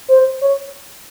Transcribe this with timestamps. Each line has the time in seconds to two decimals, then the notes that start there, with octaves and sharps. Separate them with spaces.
0.08 C5
0.41 C#5